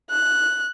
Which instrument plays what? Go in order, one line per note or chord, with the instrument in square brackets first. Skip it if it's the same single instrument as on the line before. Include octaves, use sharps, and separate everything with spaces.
[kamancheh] F#6